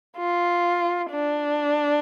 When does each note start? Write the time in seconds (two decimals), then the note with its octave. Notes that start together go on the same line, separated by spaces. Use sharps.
0.18 F4
1.10 D4